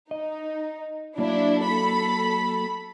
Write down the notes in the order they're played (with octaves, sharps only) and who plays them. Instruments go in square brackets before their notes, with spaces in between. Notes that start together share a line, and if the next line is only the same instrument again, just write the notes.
[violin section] D#4 [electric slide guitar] D#5
[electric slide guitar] F#3 A#3 [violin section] D4 E4
[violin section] A4 B5